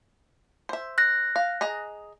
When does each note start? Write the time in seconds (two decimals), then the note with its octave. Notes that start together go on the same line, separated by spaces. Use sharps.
0.69 C5 E5
0.98 F#6 A#6
1.36 F5
1.61 G#4 D#5 A#5